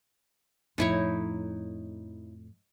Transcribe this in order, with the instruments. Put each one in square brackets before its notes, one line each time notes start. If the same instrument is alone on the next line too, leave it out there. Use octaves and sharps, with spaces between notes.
[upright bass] F2 A2 [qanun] D#4 E4 C#5